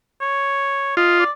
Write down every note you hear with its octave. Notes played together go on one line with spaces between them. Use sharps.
C#5
F4 D#5
D5